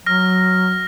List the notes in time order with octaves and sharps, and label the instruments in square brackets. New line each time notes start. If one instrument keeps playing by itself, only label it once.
[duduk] F#3 [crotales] F6 A#6